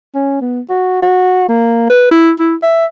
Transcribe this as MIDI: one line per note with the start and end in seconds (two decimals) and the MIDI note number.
0.15 0.39 61
0.41 0.61 59
0.69 0.99 66
1.02 1.48 66
1.48 1.87 58
1.89 2.10 71
2.11 2.32 64
2.39 2.55 64
2.63 2.85 76